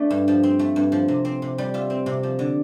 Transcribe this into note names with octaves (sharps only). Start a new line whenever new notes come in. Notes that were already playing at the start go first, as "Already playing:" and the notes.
Already playing: A3 D4
G2
F3
C4
A3
G2
F3
C3
C4
C3
G3
F4 E5
C4
C3
F3
D3